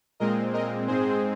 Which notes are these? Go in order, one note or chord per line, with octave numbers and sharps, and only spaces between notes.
A#2 G#3 C4 A#4 D#5
A#4 D#5
G#2 G#3 C4 G#4 C5